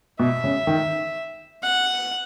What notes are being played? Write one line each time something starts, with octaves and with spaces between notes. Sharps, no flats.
B2 E5
C#3
D#3
F#5